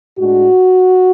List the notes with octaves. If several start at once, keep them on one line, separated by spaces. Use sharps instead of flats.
A2 G#3 D4 F#4